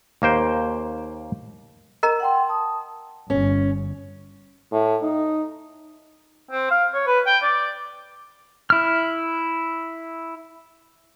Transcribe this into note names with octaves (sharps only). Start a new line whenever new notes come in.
D#2 A#3 C5 G5
A#4 D#5 A#5
F#5 G5 C6
A5 D#6
G1 C#4
A2
D#4
C4
F5
C#5
B4
G5
D5
E4 F6